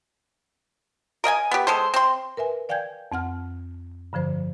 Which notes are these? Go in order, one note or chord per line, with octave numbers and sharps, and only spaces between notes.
A#4 D#5 G5 G#5
B3 G4
G#3 A4 C5
C4 C6
A#4 B4 E5 G#5
D5 F5 G5 G#5 G6 G#6
F2 C4 F#5 F6
G2 D3 F3 C5